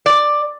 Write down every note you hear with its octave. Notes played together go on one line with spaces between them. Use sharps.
D5